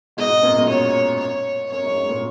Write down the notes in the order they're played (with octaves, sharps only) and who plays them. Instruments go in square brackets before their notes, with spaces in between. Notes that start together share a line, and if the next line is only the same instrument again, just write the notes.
[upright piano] G#2 B2 [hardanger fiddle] D#5
[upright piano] F#2 A#2
G#2 B2
[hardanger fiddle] C#5
C#5
[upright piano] F#2 [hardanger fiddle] C#5
[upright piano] G#2
G#2
A#2